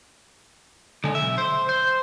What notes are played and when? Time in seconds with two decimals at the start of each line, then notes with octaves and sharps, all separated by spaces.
1.04 D3 G#3
1.15 B1 E5
1.38 C5
1.69 C5